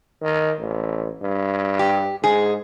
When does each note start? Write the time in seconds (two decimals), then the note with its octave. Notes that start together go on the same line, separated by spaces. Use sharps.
0.23 D#3
0.59 A1
1.22 G2
1.79 G4
2.24 G#2 G#4